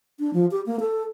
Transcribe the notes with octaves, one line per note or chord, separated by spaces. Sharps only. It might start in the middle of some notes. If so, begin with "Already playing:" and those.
D4
F3
G4
A#3
A4